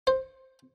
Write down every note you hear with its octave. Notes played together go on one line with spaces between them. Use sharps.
C5